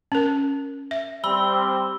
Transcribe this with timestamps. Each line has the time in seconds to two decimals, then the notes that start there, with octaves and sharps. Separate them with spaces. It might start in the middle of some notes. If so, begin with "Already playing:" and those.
0.12 C#4 A#4
0.91 E5
1.24 G3 C4 B5 E6 G7